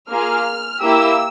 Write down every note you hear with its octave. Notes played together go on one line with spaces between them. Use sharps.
A#3 F4 G#4 F6
A#3 E4 G4 E6